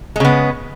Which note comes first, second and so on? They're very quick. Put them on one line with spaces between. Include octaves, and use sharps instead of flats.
G#3 C#3 B3